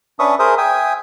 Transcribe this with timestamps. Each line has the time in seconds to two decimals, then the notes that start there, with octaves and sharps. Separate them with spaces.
0.19 C#4 D4 B4 E5 C#6 D#6
0.39 G#4 A#4 C5 E5 D#6
0.58 E5 G5 G#5 D#6